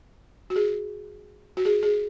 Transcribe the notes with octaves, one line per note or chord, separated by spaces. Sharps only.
F#4
G#4
F#4
G#4
G#4